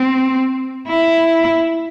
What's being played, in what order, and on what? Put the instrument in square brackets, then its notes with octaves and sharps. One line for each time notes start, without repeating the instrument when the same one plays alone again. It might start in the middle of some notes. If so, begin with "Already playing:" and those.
Already playing: [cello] C4
E4